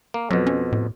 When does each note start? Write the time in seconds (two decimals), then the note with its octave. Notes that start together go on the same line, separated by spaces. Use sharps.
0.14 A#3
0.31 F2 B2 F#3
0.47 C#4
0.72 A2